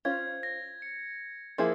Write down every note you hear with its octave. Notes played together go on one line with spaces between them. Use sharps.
C#4 F4 C5 G#6
A#6
C#7
F3 A#3 E4 G#4